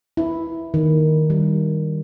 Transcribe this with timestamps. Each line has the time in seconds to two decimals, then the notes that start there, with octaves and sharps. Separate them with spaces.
0.17 E4
0.74 D#3
1.30 G3